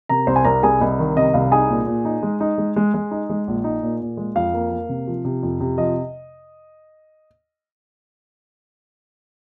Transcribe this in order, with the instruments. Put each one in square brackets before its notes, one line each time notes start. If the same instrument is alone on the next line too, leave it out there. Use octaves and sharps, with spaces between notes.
[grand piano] C3 A#4 A#5
C2 C5 C6
G#5
C2 A#4 A#5
C2 G#4 G#5
C2 D#5
D#3
C3 D#5
C2 F5
D#4 G#4 G#5
A#2
A#2
D#4
G#3
D#4
G#3
G#3
G#3
D#4
G#3
A#1
D#4
A#2
A#2
G#3
F2 F5
A#3
A#3
C3
F3
C3
F2
C3
F3 D#5